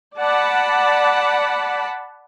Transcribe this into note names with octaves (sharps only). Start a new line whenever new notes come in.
D5 F#5 A5 B5